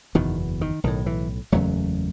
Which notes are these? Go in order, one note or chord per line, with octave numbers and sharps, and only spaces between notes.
F#1 E2 B2 D#3
D#3
B1 A2 D#3
E3
F#1 E2 C#3 F#3 A3